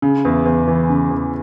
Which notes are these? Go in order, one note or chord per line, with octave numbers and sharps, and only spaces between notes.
C#3
E2
E2
E3
C#3
E2